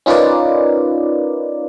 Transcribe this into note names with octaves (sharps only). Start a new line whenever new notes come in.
C#4 D#4 F4 A#4 B4 D5